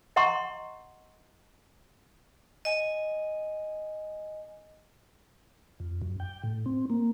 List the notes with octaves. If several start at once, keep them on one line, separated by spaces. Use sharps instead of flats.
D#5 F#5 A#5 C6 C#6
D#5 G#5
F2
F#2
G5
A2
C4
A#3